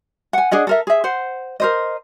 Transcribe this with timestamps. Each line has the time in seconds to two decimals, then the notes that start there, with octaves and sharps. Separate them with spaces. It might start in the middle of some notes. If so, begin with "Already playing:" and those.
0.33 F#5 G#5
0.51 D4 G#4 D#5 F#5
0.67 A4 A#4 E5
0.87 G#4 E5
1.04 C5 F#5
1.60 A#4 C5 D#5